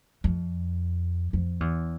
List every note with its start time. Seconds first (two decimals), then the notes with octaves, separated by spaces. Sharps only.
0.24 F2
1.33 F2
1.60 E2